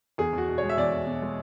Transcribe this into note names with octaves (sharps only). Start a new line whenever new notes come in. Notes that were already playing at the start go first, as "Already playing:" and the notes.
E2 G#4
E2 F#4
B2
C#5
G#3
E5
E2 D5
E2
B2
G#3